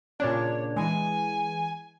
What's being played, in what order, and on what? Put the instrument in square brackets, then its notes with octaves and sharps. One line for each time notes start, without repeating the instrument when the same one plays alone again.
[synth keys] A#2 C#3 D4 [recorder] C#5
[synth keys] E3 G#3 [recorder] G#5